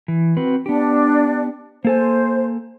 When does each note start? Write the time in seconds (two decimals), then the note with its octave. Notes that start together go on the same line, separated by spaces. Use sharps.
0.08 E3
0.37 C4 F#4 B4
0.66 B3 D4 G4
1.85 A#3 A4 C5 G#5